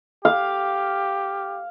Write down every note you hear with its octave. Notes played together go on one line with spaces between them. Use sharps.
G4 F5